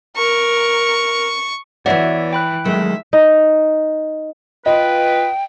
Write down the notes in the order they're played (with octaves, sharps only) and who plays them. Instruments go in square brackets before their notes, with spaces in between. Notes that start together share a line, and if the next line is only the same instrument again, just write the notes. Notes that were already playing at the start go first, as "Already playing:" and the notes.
[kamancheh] A#4 [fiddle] C#6
[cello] E3 [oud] B3 F#4 [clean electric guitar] C#5 [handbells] D5 E5
[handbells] G5 B5 F#6
[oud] D#3 [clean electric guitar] F#3 G#3 A3 [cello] E5
[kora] D#4
[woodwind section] F4 B4 [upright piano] D#5 [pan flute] G5